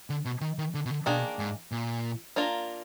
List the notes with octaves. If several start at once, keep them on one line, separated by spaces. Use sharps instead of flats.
D3
B2
D#3
D#3
D3
B2
D3
B2 D#3 A#3 D4 G#4
G#2
A#2
A#3 D4 F4 A#4